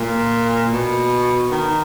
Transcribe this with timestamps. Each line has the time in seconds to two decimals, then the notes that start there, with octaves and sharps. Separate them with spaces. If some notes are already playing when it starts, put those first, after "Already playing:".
Already playing: A#2
0.72 B2
1.51 D#3